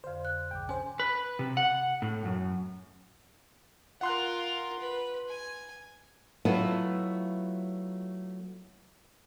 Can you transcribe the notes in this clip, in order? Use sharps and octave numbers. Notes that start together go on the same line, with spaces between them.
F2 D3 C5 F5
F#6
B1 G#2 D3 G5 D6
C#4 C5 G#5
B4
C3
F#5
A2
F#2
F4 A#4 F#5 C6 F#6
B4
G#5
F#3 A3 B3 E4 F4